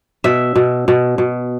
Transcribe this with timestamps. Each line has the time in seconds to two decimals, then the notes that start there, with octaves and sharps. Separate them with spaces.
0.24 B2 E5
0.56 B2
0.88 B2
1.18 B2